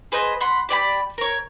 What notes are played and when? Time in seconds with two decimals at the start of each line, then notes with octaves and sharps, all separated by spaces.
0.12 G#4 B4 C5 D#5
0.41 F#5 B5 C6
0.69 G4 D5 G#5 B5
1.18 A#4 C#5